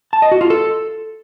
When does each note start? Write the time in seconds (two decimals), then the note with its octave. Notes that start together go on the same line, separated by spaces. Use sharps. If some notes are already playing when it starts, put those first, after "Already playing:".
0.13 A5
0.22 D#5
0.32 F#4
0.41 F4
0.50 A4